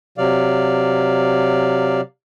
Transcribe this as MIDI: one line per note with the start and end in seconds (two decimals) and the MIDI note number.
0.18 2.01 48
0.18 2.01 54
0.18 2.01 74
0.18 2.01 77